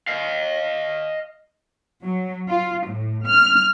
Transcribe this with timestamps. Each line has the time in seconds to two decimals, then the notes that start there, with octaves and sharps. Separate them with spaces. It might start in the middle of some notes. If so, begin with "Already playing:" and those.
0.07 D#5 F5
2.03 F#3
2.48 F4
2.86 A2
3.25 F6